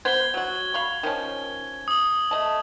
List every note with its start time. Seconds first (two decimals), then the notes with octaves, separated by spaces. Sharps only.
0.05 B3 C5 G#6 G7
0.34 F#3 F#4
0.74 F5 B5 C#6
1.03 D#3 F3 C#4
1.88 D#6 F#7
2.31 A3 D#5 A5